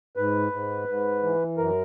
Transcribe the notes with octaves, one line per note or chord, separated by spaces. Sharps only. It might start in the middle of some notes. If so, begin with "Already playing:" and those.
G#2 B4
G#2
G#2
E3
F#2 A#4